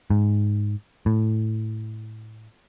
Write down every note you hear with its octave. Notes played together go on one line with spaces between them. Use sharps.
G#2
A2